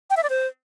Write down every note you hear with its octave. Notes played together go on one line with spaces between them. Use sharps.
G5
E5
D5
C5